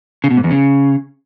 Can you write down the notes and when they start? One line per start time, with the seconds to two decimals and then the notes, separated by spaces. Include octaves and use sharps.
0.24 C#3
0.31 B2
0.37 G#2
0.44 E2
0.51 C#3